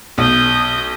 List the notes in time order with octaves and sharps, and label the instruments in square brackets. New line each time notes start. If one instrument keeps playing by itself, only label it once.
[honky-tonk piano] B1 [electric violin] D#6 G6